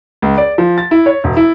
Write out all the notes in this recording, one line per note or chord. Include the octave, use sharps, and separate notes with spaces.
C#2
D5
F3
A6
E4
C#5
E1
E4